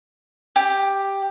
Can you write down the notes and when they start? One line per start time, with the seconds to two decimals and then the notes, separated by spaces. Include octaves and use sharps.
0.56 G4